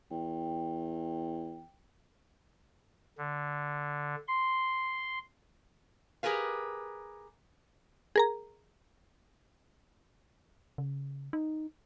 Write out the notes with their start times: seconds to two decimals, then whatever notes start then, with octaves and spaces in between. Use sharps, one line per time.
0.11 E2 G5
3.18 D3
4.28 C6
6.23 G4 G#4 A#4 B4 F5
8.16 G#4 A#4 A#5
10.78 C#3
11.33 D#4